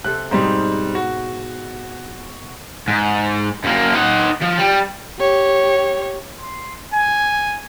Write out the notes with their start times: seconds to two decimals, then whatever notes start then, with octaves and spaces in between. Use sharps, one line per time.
0.04 C3 C4 A4 F#6
0.31 G#2 B2 G3 C4 D#4
0.95 F#4
2.88 G#2
3.64 F#2 A#3
3.94 D#4 F#5
4.42 F3
4.58 G3
5.20 G4 C#5
6.41 C6
6.94 G#5